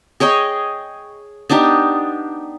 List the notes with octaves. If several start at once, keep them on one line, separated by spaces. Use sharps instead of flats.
G#4 C#5 D#5 G5
B3 D4 D#4 G4